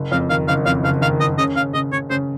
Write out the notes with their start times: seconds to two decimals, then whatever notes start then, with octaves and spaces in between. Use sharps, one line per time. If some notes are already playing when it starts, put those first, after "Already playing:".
Already playing: F#1
0.11 F2 F5
0.30 D#3 F5
0.48 F#1 F5
0.66 F2 F5
0.84 F#1 F5
1.01 D#3 F5
1.20 F#1 D#5
1.38 C#3 D#5
1.56 C#3 F5
1.74 C#3 D#5
1.92 C#3 C#5
2.10 C#3 C5